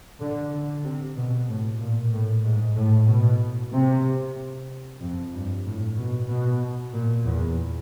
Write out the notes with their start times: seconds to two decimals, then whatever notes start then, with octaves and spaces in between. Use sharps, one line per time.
0.20 D3
0.52 D3
0.84 C3
1.17 B2
1.48 A2
1.80 A#2
2.13 A2
2.45 G#2
2.77 A2
3.09 B2
3.72 C3
5.00 F2
5.33 G2
5.65 A2
5.97 B2
6.29 B2
6.93 A#2
7.26 E2